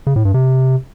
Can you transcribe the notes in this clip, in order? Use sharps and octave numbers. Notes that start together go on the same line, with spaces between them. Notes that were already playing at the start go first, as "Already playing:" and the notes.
C#3
A2
G2
C3